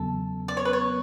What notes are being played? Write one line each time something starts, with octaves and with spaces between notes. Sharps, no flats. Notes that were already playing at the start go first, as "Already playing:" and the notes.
Already playing: E2 C#3 F#3 B3 A4
D5
C#5
B4
C#5